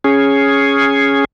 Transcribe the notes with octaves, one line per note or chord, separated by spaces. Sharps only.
C#4 G#4